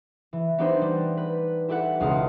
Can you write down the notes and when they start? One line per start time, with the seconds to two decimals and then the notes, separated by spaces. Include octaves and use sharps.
0.33 E3
0.58 B3 D4 D#4 G4 B4 C5
0.81 G3
1.17 B4
1.68 E4 G4 A4 B4 F#5
2.00 E1 C#2 F5 D#6 C#7